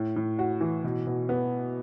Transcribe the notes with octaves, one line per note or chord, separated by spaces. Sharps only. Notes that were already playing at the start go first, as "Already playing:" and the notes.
Already playing: A2
A2
F#4
E3
B2
B2
B3